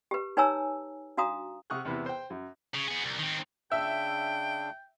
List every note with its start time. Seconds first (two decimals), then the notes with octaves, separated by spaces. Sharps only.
0.11 G4 B4
0.37 D#4 B4 C#5 G#5 A#5 E6
1.17 D4 F#4 F5 A#5 D#6
1.70 C3 F#5 C#6 D#6 F6 F#6
1.85 E2 C3 B3 E4
2.06 C5 G5
2.30 F#2
2.75 C#3
2.88 B3 G#4
3.04 C2
3.19 D#3 C4
3.72 C#3 D4 E5 G5